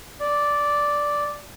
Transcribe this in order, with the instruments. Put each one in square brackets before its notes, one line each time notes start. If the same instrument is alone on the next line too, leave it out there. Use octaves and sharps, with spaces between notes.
[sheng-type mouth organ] D5